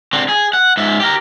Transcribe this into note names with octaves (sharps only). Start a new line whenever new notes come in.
D3 C4
G#4
F#5
G#2 E5
G4 A#4